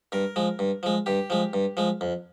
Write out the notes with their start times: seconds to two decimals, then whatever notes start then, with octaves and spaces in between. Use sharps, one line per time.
0.12 G2 A#4
0.36 F3 G#3
0.59 G2
0.83 F3 G#3
1.06 G2 G4
1.30 F3 G#3
1.53 G2
1.77 F3 G#3
2.01 F2